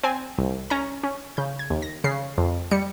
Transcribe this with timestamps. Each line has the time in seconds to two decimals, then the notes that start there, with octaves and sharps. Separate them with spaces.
0.03 C4 G#5
0.38 C2
0.70 C#4 A#5
1.03 C#4
1.37 C#3 G6
1.59 G#6
1.70 D#2
1.82 A#6
2.04 C#3 C7
2.38 F2
2.71 G3 C#7